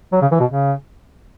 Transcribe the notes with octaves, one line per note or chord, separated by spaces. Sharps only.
F#3
C#3
E3
B2
C#3